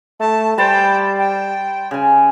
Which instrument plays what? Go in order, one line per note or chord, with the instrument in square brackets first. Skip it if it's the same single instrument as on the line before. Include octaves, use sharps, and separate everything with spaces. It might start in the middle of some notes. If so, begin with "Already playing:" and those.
[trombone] A3 [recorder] A5
[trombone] G3 [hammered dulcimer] C5 A5 B5 [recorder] G5
[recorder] G5
[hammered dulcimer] C#3 G#5